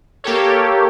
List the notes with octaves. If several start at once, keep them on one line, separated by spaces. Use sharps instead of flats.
A#3 G4 A4 C#5